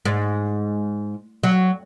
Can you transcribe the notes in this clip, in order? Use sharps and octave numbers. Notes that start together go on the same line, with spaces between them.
G#2
F#3